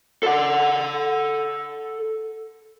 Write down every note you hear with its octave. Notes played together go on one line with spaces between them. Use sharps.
A4 F#5